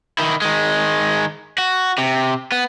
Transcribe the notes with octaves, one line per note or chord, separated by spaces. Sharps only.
D#3 E4
D#3 G#3
F#4
C3
B3